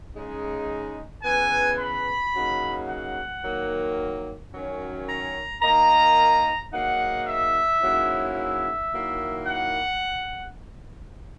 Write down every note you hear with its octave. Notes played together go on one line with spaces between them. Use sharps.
C#3 G#3 D#4
C#3 E3 B3 G#5
B5
C#3 F#3 A#3 D#4
F#5
D#3 F#3 A#3
F#2 D#3 F#3 C#4
A#5
D#3 A#3 D#4 A#5
G#2 F#3 A#3 D#4 F#5
E5
G#2 F#3 A#3 C#4 E4
E5
D#3 F#3 A#3 E4
F#5